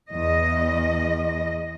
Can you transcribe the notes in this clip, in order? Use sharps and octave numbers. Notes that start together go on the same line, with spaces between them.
E2 D#5